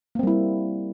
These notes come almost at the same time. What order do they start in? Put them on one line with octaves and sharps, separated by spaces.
A#3 C4 G3 E4